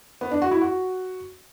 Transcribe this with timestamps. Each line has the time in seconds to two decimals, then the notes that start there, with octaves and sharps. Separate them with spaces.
0.21 B3
0.31 D4
0.42 F#4
0.51 E4
0.61 F#4